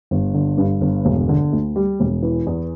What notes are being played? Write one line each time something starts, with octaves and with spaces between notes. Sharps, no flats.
G1
D3
G2
G1
E1
D3
D2
G3
E1
E3
E2